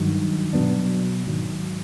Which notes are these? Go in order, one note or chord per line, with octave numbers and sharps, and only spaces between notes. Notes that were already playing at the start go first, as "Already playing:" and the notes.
Already playing: G2 D#3 F#3
B2 F#3 B3 D4
G#2 D#3 F#3